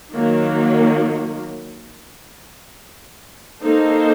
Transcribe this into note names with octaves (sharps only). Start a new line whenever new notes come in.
D#3 F#3 A#3
A#3 D#4 A4 C5